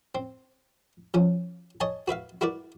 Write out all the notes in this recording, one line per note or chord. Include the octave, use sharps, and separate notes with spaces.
C4
F3 C#4
C#5 D#5 G#5 A5
F#4 B4 E5 F5
E4 F#4 A#4 B4 D5